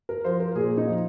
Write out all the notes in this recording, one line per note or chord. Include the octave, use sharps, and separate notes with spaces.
A#4
F3 C5
A#4
A#2 G#4
D#4
F3